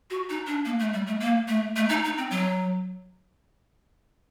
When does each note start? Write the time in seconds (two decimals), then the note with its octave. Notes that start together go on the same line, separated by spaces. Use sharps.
0.10 F#4
0.29 D#4
0.47 D4
0.65 A#3
0.79 A3
0.93 G3
1.07 A3
1.20 A#3
1.48 A3
1.76 A3
1.89 D#4
2.04 D#4
2.18 C4
2.31 F#3